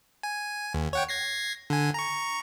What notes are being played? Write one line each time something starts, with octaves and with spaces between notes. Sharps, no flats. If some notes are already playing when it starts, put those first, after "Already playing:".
G#5
D#2
C#5 F#5 G5
G#6 A#6 C7
D3 G#5
A#5 C#6